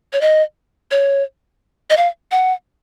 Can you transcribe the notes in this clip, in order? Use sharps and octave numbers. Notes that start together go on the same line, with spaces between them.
C#5
D#5
C#5
D#5
F5
F#5